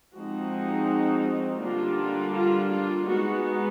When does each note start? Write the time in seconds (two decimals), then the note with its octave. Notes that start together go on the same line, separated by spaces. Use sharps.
0.16 F3 G#3 C4 D#4 F#4
1.62 D3 G3 A#3 D4 F4
2.35 F4
2.71 F4
3.07 G#3 B3 D#4 F#4